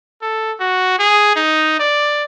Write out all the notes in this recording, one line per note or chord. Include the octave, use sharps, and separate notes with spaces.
A4
F#4
G#4
D#4
D5